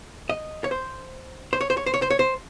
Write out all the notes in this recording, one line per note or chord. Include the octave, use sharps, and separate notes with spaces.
D#5
C#5
C5
C5
C#5
C5
C#5
C5
C#5
C5
C#5
C5